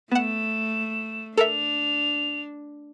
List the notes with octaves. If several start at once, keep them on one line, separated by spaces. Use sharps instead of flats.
A3 B3 F#5 E7
D4 A4 A#4 E5 F7